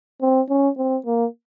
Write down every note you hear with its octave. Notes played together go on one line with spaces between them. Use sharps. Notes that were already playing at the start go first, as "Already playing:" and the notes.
C4
C#4
C4
A#3